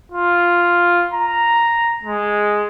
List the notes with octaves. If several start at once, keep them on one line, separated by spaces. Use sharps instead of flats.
F4
A#5
G#3